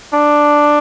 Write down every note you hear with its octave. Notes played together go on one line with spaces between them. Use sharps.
D4